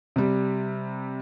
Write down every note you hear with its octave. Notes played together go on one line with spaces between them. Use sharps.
C3 G3